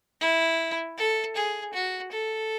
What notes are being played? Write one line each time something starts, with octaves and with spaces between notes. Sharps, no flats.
E4
A4
G#4
F#4
A4